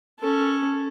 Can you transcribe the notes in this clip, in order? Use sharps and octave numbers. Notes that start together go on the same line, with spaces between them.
C#4 A4